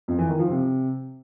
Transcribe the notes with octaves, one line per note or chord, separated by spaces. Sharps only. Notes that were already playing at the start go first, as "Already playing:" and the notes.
F2
E3
D#3
F3
C3